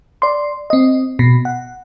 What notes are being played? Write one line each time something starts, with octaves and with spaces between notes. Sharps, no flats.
D5 C6
C4 D#5
B2
F#5